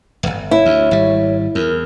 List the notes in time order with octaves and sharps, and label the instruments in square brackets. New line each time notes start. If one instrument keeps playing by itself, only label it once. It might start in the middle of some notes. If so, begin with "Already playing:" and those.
[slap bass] D1 G1
[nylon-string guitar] E4 [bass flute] C#5
[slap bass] D2
G#1 G3
[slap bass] E2 [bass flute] A#4